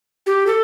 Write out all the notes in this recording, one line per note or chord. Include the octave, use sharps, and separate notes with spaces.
G4
A4